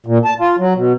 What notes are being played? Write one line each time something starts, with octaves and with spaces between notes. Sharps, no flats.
A#2
A5
F4
F#3
B2